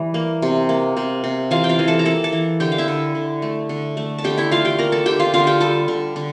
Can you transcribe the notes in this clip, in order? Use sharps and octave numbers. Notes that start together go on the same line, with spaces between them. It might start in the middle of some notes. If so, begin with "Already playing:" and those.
Already playing: E3 G3
A#3
C3
A#3
C3
C3
E3 F4 F5
G5
F4 F5
E3
A4 A5
A#5
A#3 A4 A5
A4 A5
E3
D3 G4 G5
F5
E4 E5
D3
D3
A3
D3
A3
A5
D3 G4 G5
E4 E5
A3 F4 F5
G4 G5
A#3 A#4 A#5
A4 A5
D3 G4 G5
F4 F5
D3 F4 F5
G4 G5
G3 A4 A5
D3
D3